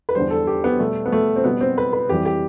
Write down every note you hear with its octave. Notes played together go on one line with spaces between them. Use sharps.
B4
E2 D3 G3 C5
A4
G4
B3
B2 G3 A3
B3
A3
C4
B2 G3 B3
C4
B4
B4
F2 E3 G3 G4
G4